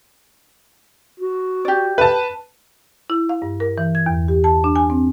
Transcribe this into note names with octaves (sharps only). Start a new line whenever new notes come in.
F#4
G4 D5
B4 A5
E4
F5
G2
A#4
E3
G#6
E2
G4
A5
D4
G#5
C4